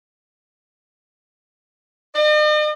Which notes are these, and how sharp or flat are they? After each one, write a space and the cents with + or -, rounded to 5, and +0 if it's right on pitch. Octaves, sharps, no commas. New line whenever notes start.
D#5 -45